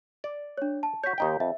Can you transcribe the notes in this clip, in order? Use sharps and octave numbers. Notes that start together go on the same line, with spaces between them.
D5
D4 C#5
A5
F#4 C#5 G6 B6
D#2 D#4 G5
F2 E5